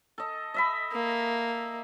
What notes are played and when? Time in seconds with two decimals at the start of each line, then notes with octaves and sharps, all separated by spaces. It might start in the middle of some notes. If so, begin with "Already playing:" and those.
0.18 A4 D#5
0.54 D#5 E5 B5
0.92 A#3